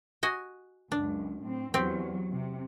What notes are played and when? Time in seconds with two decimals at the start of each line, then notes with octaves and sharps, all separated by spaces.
0.23 F#4 D#5 G#5
0.92 C#2 F#2 D4
1.44 A2 C4
1.74 E2 F#3 C4 G4
2.32 C3